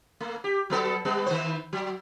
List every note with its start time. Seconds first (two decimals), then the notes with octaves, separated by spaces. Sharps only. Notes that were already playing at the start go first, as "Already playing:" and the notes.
0.20 A3
0.44 G4
0.70 F#3 B3 A4
1.05 G3 B3
1.26 D#3 B3 C5
1.73 F#3